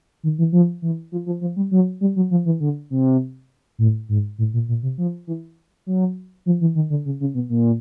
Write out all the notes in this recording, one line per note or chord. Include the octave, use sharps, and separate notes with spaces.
D#3
E3
F3
E3
F3
F3
F3
G3
F#3
G3
F#3
F3
E3
D3
C3
A2
G#2
A2
A#2
A#2
C3
F3
E3
F#3
F3
E3
D#3
D3
C#3
C#3
B2
A#2